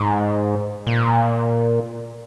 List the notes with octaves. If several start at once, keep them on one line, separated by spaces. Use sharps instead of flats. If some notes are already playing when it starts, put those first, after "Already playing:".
Already playing: G#2
A#2